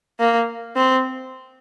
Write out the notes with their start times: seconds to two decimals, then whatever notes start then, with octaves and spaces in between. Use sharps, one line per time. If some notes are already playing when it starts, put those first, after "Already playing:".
0.20 A#3
0.76 C4